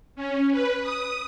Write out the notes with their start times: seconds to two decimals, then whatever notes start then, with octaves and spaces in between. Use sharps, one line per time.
0.16 C#4
0.52 B4
0.82 D#6